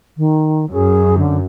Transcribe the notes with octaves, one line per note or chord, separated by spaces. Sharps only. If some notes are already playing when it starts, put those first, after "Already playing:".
D#3
F#2 G#4
D3